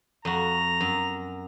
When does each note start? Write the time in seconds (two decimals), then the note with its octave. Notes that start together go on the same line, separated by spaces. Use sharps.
0.25 F2 F#4 A#5
0.80 F#2